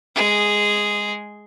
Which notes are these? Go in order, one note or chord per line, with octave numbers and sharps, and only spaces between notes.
G#3 G#4